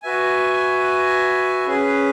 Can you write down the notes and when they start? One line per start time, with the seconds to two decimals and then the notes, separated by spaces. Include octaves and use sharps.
0.03 F#4 B4 E5 G#5
1.66 C#4 G#4 B4